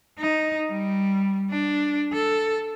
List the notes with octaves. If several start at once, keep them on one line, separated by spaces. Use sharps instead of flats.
D#4
G3
D4
A4